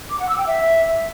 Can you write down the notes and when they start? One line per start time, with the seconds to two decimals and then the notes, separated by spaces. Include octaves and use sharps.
0.10 D6
0.19 F#5
0.29 E6
0.38 G5
0.47 E5